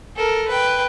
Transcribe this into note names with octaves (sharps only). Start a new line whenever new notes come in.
A4 A#4
B4 G5